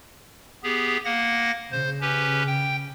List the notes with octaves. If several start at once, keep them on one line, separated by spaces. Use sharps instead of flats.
B3 G4 G#4
A#3 F#5 A#6
C#3 C5
C#4 G4 B4
G5